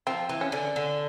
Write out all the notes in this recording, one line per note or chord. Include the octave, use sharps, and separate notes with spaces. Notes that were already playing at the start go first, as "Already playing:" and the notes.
F3 C4
E3
C#4
D3
D3